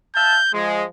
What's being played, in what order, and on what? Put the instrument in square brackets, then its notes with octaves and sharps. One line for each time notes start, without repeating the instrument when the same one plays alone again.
[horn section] E5 F5 A5 [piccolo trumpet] G6
[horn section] F3 G#3 [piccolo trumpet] G#4